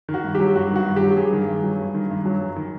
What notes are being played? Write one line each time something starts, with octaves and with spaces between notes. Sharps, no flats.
D#3
F#4
G2
F#3 G4
G2 F#4
D#3 F#4
G2
G4
F#3
G2 G#4
D#3
G2
F#3
G2
D#3
G2
F#3
F#2
D#3